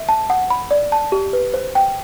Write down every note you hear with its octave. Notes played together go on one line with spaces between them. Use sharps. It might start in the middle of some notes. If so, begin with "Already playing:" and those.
Already playing: E5
A5
F#5
B5
D5
A5
G4
B4
C5
G5